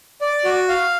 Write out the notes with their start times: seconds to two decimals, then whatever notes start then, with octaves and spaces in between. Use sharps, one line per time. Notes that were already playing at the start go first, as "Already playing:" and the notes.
0.21 D5
0.45 F#4
0.69 F5